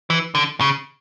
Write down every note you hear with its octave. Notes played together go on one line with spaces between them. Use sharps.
E3
D3
C#3